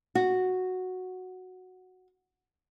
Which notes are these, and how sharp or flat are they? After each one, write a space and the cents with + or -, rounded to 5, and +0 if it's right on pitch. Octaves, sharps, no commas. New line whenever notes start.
F#4 -5